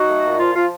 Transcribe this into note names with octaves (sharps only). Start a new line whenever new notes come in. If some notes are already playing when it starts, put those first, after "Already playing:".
Already playing: F#3 D#4 F#4
A3
A#2
F3 F4
F3 F4